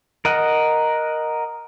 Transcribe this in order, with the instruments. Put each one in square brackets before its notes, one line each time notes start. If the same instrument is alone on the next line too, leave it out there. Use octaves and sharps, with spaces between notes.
[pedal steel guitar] A#4 D#5 F#5